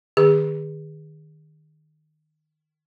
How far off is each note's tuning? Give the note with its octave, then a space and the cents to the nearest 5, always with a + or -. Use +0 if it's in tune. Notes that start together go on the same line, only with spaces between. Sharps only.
D#3 -15 G#4 -30